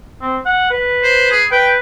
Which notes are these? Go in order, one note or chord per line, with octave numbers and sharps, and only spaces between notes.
C4
F#5
B4
C5
G#4
B4 G5